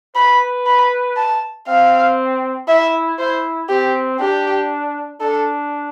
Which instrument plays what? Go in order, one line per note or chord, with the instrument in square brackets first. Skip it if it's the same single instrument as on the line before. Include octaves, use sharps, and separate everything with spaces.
[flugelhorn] B4 [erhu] B5
[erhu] B5
A5
[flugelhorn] C4 [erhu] F5
[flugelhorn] E4 [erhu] E5
[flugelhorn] E4 [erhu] C5
[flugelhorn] C4 [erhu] G4
[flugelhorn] D4 [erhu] G4
[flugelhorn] D4 [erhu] A4